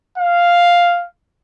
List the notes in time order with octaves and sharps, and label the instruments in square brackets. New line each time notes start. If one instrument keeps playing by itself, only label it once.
[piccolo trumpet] F5